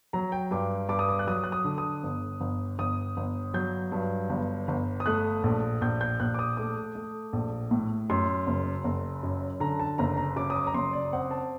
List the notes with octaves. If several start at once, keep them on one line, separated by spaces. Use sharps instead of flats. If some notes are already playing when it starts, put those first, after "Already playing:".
F#3 A#5
G5
G2 D6
G2 D6
D#6
D6
F#6
F#3 D#6
F#6
D#6
D3
D#6
G1
G1
G1 D#6
G1
F#3 G6
G2
G1
G1
D#6
A3 F#6
A#1
A#1 G6
G6
A#1 F#6
D6
D#6
A3 D6
A3
A#1
A2
F#2 C6
F#1
F#1
F#2
D3 A#5
A5
F#1 A#5
A#5
F#2 D6
D#6
D6
A#5
F#1 C6
D5
C4 F#5
A5